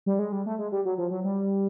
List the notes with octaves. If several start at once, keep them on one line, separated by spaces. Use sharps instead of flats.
G3
G#3
G3
A3
G#3
G3
F#3
F3
F#3
G3